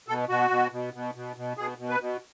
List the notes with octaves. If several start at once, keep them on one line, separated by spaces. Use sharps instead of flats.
B2 A4
B2 F#4
B2
B2
B2
B2
B2
B2 G#4
B2
B4
B2